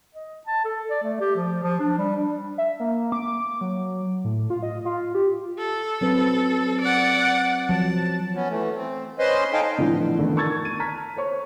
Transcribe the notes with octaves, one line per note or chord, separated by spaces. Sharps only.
D#5
A5
A4
D5
A3
G4
F3
F3
D4
G3
D4
E5
A#3
D6
F#3
A2
F4
D#5
F4
G4
A4
F#3 C4 B4
D5 F#5
F3 F#3 A5
B3 C#4
E3 A3
C4
C#4 B4 C5 D#5 C6
D#4 A4 D#5 F5 G5 G#5
A2 D3 E3 F3 B3
D3 D#3 A3 B3
A#4 A5 C#6 E6 G#6 A6
D#7
A5 A#5 F6 B6
C5 C#5 C#6